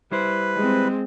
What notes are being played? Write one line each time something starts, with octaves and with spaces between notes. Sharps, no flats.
G3 E4 B4 C5
G#3 C4